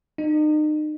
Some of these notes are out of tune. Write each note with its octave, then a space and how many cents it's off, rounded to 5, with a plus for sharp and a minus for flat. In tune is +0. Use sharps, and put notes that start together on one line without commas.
D#4 -35